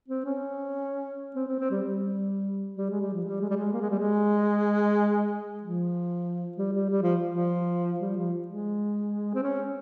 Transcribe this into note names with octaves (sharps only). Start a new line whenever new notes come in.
C4
C#4
C4
C4
C4
G3
G3
G3
G#3
G3
F3
G3
G#3
G3
G#3
A#3
G#3
G3
G#3
F3
G3
G3
G3
F3
F3
G3
F3
G#3
C4
C#4